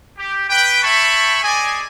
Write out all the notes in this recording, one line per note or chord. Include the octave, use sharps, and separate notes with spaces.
G4
B4 G5
C#5 E5 G5 A5 B5 C#6
G#4 D5 D#5 G#5